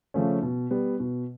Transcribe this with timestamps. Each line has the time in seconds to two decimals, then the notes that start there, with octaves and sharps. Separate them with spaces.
0.14 C#3 F3 A3 C#4
0.42 B2
0.71 G3 B3
1.00 B2